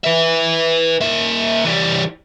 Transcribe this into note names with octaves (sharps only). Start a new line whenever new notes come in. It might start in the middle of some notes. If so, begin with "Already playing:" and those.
B4 E5
A#3 E5
E3 G3